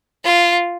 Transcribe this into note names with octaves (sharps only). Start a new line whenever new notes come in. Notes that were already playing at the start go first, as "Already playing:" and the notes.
F4